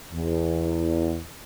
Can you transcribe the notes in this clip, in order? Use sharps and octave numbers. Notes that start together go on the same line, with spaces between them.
E2